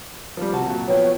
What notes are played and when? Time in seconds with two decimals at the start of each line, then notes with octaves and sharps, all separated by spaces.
0.37 F3 G3
0.52 C3 F#4 A5
0.66 A#2 F#3
0.88 F3 B3 C#5 G5